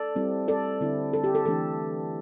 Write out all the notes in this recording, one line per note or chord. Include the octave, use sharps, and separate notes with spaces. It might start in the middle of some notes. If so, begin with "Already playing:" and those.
Already playing: A4 D5
G3 C4 E4
A4 D5
D3 C4 E4
A4
G4
A4
E3 A3 D4 A4